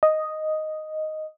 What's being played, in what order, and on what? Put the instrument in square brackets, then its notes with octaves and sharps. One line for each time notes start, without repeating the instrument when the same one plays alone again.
[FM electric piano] D#5